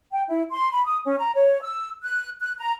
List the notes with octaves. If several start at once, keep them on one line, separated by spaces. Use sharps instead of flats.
G5
E4
C6
B5
D#6
C#4
A#5
C#5
E6
F#6
F#6
A#5